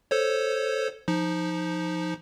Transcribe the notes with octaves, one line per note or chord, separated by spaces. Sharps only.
A4 C5 C#5
F3 D#4